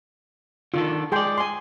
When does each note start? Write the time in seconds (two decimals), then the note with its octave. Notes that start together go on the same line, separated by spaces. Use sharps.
0.74 D3 D#3 F4 A4
1.12 G#3 G#4 D5 G5 C6
1.38 G#5 C6